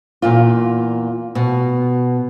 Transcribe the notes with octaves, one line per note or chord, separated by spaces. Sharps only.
E2 A#2 F4
B2